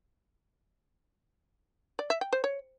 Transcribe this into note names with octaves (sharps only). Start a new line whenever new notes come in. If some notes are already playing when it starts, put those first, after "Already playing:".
D5
E5
G5
C5
C#5